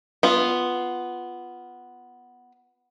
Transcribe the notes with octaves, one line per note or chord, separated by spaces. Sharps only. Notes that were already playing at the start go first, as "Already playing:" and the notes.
B3 F4